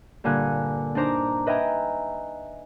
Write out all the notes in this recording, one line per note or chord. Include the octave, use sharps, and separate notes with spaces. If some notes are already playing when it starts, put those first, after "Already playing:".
G2 A#2 D3 G#5 F#6
D4 D#4 C5 A#5 D6
B4 D#5 E5 G5 G#5 A#5